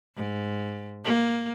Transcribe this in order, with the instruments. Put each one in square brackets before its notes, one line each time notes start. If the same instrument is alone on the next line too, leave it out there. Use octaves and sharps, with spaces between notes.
[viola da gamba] G#2
A#3